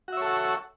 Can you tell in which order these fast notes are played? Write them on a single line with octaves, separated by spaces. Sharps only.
F#4 E5 C#5 A4 F#5